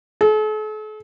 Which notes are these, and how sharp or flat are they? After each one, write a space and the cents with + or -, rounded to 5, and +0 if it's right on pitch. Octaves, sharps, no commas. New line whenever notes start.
A4 -45